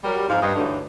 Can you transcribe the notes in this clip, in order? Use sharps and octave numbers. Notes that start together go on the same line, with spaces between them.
F#3 G3 A#4
F2 G#2 F5
G2 D#5
D2 G2 D3 E3 F#3 D#4